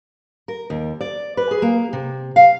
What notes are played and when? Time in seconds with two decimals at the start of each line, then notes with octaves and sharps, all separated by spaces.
0.48 A#4
0.70 D#2
1.01 D5
1.37 B4
1.51 G#4
1.62 A#3
1.93 C3
2.36 F5